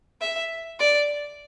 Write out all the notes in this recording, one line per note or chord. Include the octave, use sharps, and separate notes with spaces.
E5
D5